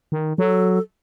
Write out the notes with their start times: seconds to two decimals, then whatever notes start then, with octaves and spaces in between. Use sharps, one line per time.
0.12 D#3
0.38 F#3 A4